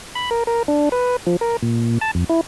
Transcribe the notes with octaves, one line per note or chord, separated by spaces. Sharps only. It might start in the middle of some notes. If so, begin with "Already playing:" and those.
B5
A#4
A#4
D4
B4
F3
A#4
A#2
A5
F2
E4